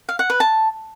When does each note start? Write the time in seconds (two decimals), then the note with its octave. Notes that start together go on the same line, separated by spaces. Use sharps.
0.09 F5
0.19 F#5
0.30 B4
0.40 A5